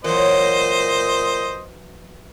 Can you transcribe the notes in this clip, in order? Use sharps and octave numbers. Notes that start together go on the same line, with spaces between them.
A#2 E3 F#3 C5 D#5